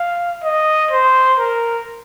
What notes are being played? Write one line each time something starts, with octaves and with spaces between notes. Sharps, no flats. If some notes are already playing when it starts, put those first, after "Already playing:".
Already playing: F5
D#5
C5
A#4